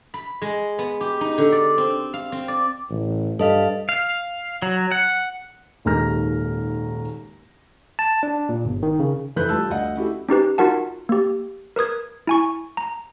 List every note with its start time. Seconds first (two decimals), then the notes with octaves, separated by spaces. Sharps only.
0.14 B5
0.42 G#3
0.79 B3
1.01 G4
1.21 D#4
1.38 D3
1.52 D5
1.78 C4
2.14 F5
2.32 C4
2.48 D5
2.90 A1
3.39 G2 A4 D#5 F5
3.89 F5
4.62 F#3
4.92 F#5
5.85 D#1 D#2 G#2 A#5 F6 A#6
7.99 A5
8.23 D4
8.49 A#2
8.65 G1
8.83 D#3
8.99 C#3
9.36 F1 E3 A4 B4 F#6 G6
9.49 G3 F4 A5 E6
9.70 D2 D#5 F#5
9.97 C#4 E4 F#4 G4 A4
10.29 C#4 D#4 G4 B4
10.58 D#4 F4 F#4 A#4 F#5 A5
11.09 A#3 G4
11.76 A#4 B4 D#6 G#6
12.27 E4 G#5 C#6
12.77 A#5